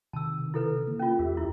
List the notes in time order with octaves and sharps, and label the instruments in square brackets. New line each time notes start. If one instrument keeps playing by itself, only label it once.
[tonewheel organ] C3 D#3 [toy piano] A5 E6
[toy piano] E4 A4 B4
[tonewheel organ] A#3
[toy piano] C#4 F4
[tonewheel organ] E2 G4 E5
[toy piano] E4